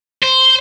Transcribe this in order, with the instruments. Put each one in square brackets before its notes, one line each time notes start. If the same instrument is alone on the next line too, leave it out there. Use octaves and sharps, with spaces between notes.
[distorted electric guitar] C5